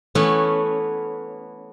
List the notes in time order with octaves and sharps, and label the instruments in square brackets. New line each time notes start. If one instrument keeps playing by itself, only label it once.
[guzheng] E3 A3 B3 C#4